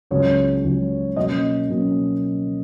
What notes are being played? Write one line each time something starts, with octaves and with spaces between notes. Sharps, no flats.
C#2 C#3 F#3 C#5
C#2 C#3 F#3
B2 F#3 A#3 C#4 D#5
B2 F#3 A#3 C#4